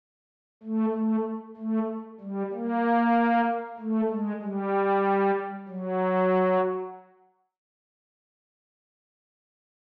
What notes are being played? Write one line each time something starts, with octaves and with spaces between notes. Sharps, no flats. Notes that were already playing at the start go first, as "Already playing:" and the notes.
A3
A3
A3
G3
A#3
A3
G#3
G3
F#3